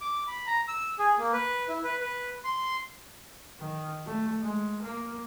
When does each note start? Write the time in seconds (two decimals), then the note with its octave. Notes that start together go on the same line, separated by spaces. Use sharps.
0.01 D6
0.28 B5
0.47 A#5
0.68 E6
0.99 G#4
1.19 A#3
1.33 B4
1.69 E4
1.84 B4
2.00 B4
2.44 C6
3.60 D#3
4.06 A3
4.41 G#3
4.82 A#3